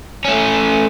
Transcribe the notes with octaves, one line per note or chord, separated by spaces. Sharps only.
A3 C#4